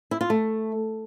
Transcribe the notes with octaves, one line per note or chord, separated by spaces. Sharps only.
E4
F4
A3